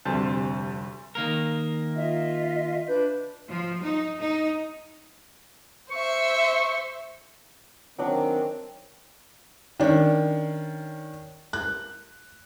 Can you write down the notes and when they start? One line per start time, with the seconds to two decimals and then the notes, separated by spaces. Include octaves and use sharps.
0.05 F1 D2 G3 C4 C5 A5
1.15 D#3 A#3 A#4
1.96 F4 D#5 E5
2.87 D4 B4 G6
3.47 F3
3.83 D#4
4.20 D#4
5.91 C5 E5 C#6
7.98 D#3 F#3 C4 D4
9.80 D#3 C#4 D4
11.53 F#6